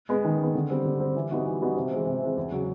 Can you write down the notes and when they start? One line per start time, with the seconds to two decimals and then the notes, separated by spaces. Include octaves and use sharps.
0.09 G#3 B3
0.25 D#3
0.39 G#3 B3
0.55 D3
0.70 G3 C4
0.85 D3
1.00 G3 C4
1.16 E3
1.31 G3 B3 D#4 F#4
1.46 E3
1.61 G3 B3 D#4 F#4
1.76 C3
1.91 E3 G#3 C4
2.07 C3
2.22 E3 G#3 C4
2.37 E2
2.52 C#3 F#3